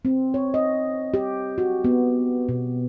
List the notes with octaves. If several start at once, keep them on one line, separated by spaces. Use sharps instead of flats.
C4
C#5
D#5
G4
F#4
B3
B2